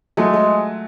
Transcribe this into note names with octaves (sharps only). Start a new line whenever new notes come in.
F#3 G#3 A3
G#3